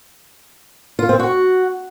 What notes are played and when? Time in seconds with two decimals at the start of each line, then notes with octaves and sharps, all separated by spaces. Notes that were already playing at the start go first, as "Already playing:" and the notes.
0.99 F4
1.09 C4
1.19 F#4